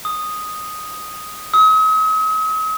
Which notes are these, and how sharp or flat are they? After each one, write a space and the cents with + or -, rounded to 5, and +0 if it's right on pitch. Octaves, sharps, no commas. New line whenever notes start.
D#6 +0
D#6 +45